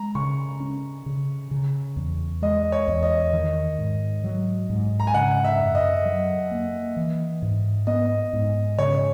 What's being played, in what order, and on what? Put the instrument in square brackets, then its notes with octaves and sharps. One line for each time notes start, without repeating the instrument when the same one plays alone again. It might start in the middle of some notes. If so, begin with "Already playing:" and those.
Already playing: [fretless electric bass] G#3 [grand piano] A#5
[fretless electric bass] C#3 [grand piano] C#6
[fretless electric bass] C#4
C#3
C#3
E2
[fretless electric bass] G#3 [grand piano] D#5
[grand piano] C#5
[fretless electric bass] E2
[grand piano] D#5
[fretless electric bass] D#3
G#2
F#3
G#2
[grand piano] A#5
G#5
[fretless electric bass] C#3 [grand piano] F#5
[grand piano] E5
[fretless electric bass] F#2
[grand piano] D#5
[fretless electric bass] F#3
A#3
E3
G#2
[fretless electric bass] B3 [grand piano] D#5
[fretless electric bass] G#2
[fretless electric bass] C#3 [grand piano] C#5